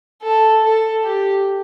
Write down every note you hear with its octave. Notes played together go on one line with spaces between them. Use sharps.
A4
A4
G4